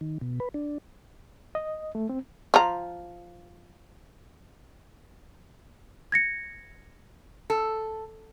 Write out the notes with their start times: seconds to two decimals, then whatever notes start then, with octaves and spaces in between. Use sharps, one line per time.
0.01 D#3
0.21 B2
0.40 B4
0.54 D4
1.55 D#5
1.95 A3
2.09 C4
2.54 F3 A#5
6.12 G#6 A#6 C#7
7.50 A4